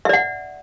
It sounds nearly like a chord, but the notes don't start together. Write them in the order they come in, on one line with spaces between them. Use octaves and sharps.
E5 D5 F#5